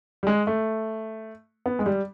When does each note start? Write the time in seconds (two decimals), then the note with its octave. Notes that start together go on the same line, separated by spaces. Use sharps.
0.23 G3
0.27 G#3
0.47 A3
1.66 B3
1.79 G#3
1.86 G3